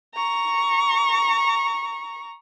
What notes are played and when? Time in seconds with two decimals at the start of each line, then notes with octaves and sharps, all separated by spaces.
0.15 A#5 C#6